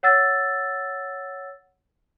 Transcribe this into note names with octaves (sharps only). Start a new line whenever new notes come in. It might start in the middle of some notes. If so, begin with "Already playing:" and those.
C#5 F#5 E6 A6